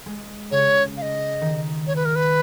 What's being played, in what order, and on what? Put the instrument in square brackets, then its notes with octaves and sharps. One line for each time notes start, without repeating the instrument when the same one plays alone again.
[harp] G#3
[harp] C#3 [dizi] C#5
[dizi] F5
D#5
[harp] D#3
[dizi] C#5
B4
A#4
B4